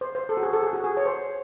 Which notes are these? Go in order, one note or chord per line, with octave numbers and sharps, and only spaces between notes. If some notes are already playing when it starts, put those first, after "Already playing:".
C5
C5
A4
F#4
G#4
A4
G#4
F#4
G#4
C#5
C5